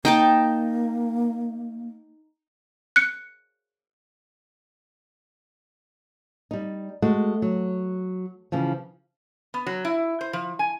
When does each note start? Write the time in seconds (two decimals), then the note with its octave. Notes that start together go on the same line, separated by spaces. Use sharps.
0.05 A#3 D#4 G5 A5
2.96 F#6 C#7
6.51 G3 D#4
7.02 G#3 A3 F#4
7.42 F#3
8.52 C#3 E3 F3
9.54 B3
9.67 F#3
9.85 E4
10.21 C5
10.33 F3
10.59 G#5